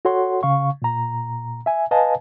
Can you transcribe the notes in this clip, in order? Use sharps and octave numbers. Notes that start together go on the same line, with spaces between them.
F#4 A4 C#5 F#5 C6
C#3 F5 C#6
A#2 A#5
E5 G#5
B4 D#5 F5 G#5 A5